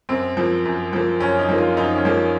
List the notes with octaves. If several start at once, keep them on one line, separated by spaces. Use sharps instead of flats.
F#2 C4
F3 A#3
F#2
F3 A#3
F#2 C#4
D#4
F3 A#3
F4
F#2 D#4
C#4
F3 A#3